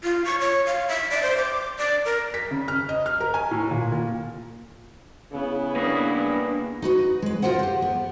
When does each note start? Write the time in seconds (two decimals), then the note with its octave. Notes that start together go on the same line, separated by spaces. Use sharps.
0.04 F4
0.25 C#6
0.41 C#5
0.66 F5
0.88 E5
1.11 D5
1.23 C5
1.37 D6
1.78 D5
2.05 A#4
2.34 B6
2.51 C#3
2.68 F6
2.89 D#5
3.06 F6
3.20 A#4
3.34 G#5
3.51 A2
3.71 A#2
3.92 A#2
5.32 C#3 B3 E4
5.76 A#3 D4 G#4 B4
6.82 D#4 F#4 B4
7.22 G#3 B4
7.42 F4 G4 A#4 C5 F#5
7.59 G4 C5
7.82 B3